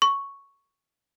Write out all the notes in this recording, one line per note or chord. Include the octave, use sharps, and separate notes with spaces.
C#6